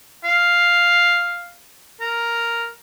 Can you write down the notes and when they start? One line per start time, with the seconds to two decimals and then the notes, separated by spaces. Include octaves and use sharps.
0.24 F5
2.01 A#4